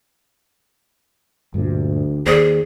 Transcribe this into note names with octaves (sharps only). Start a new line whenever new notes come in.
D2 G2 A#2
D#2 G#4 C5 D5